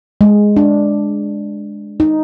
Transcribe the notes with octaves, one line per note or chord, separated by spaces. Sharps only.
G#3
D4
D#4